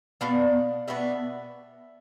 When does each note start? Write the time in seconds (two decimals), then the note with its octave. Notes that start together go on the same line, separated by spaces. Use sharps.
0.21 B2 B3 D4 F5
0.88 B2 B3 D4 E5